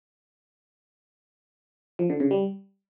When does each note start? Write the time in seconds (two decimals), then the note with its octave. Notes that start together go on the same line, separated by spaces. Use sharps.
1.99 F3
2.10 D3
2.20 C#3
2.31 G3